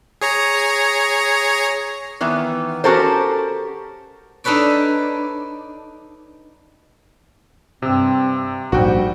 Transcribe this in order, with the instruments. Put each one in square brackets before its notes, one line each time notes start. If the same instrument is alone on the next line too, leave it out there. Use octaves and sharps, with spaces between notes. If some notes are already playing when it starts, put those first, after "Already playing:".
[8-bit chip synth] G#4 C#5 A#5
[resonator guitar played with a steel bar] D#3 E3 B3
C#4 F#4 G4 A4 A#4 C5
[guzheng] D4 D#4 A4 B4 C#5 D5
[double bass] G2 [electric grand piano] C3 E6 [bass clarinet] C4
[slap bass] A#1 [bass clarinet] G#2 [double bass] G3 [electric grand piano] F#4 G5